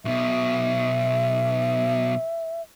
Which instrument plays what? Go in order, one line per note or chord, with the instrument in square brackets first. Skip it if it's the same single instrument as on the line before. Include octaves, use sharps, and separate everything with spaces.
[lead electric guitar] B1 B2 [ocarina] E5